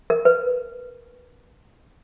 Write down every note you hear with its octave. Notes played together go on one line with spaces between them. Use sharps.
A#4
B4